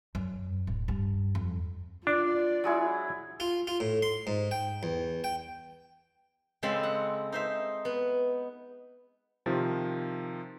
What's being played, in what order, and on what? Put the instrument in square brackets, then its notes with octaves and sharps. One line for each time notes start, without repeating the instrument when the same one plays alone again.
[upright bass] F#2
D1
G2
F2
[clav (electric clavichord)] D4 [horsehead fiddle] F4 [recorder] D5
[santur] F#3 G#3 E4
[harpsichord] F4
F4
A2
C6
G#2
G5
E2
G5
[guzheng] C#3 G#3 C4 A4 G5 B5
F#5
D#4 C5 E5
B3
[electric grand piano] C3 D#3 F3